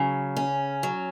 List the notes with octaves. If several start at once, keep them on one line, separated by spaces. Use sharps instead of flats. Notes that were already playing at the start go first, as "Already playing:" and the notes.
Already playing: C#3 F#3
C#4
F#3